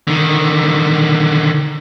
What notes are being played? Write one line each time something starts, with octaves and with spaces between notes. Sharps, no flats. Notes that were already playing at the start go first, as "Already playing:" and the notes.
D3 D#3